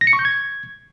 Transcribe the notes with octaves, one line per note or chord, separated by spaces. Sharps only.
A#6
C#7
C#6
G6
G#6